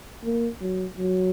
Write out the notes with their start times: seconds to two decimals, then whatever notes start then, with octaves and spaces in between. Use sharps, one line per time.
0.24 A#3
0.61 F#3
0.98 F#3